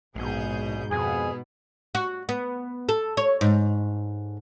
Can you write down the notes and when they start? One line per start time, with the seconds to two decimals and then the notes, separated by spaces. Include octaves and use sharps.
0.16 A#1 G#2 B2 G#4 G6
0.91 F2 B2 B3 G#4
1.95 F#4
2.29 B3
2.89 A4
3.17 C#5
3.41 G#2